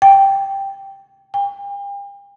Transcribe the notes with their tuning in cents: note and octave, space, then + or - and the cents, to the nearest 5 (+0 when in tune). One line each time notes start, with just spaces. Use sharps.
G5 +0
G5 +40